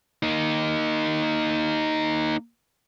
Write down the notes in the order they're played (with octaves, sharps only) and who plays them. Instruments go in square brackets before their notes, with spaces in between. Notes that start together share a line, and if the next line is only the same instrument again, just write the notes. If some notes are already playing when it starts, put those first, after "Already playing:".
[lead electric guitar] A#3 D#4